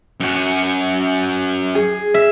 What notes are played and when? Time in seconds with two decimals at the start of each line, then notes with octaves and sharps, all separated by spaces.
0.20 F#2 F#4
1.75 G#4
2.14 E5